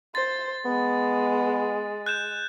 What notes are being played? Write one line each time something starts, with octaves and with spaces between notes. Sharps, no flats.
C5 A6
G#3 B3
F#6 G6 E7